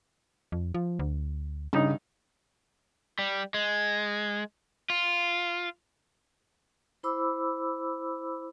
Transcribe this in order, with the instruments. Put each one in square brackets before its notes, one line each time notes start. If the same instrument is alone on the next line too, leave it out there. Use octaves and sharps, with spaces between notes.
[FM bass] F2
F3
D2
[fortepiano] G2 D#4 D#5 [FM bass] C#3
[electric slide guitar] G3
G#3
F4
[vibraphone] E4 C5 B5 D6 E6